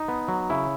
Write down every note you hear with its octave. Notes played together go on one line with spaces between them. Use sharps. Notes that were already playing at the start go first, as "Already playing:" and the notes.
Already playing: D#4
B3
F#3
C#3 E4